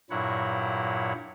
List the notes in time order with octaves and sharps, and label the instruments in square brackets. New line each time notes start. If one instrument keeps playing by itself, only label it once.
[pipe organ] G2 A#2 F#3 E4 C#5 F#5